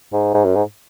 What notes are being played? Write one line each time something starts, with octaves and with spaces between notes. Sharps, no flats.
G#2
G#2
F#2
G#2